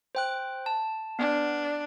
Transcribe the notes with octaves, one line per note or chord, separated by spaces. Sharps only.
C5 G5 F#6
A5
B3 D4